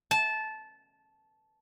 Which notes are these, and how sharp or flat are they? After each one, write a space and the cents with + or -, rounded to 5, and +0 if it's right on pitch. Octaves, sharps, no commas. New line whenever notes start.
A5 -15